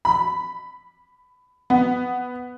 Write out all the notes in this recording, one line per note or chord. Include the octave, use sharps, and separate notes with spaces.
B5
B3